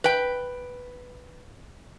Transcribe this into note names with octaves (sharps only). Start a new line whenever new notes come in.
B4 G5